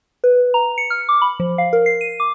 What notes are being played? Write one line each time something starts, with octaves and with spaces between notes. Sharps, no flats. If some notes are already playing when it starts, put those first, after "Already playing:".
B4
A#5
C#7
F6
D6
B5
F3
F5
A#4
C7
D#7
D6